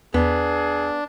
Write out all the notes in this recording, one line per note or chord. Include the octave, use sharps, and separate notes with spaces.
E2 B3 D4 G#4